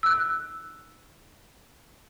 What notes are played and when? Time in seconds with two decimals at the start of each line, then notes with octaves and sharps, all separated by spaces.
0.03 E6 F#6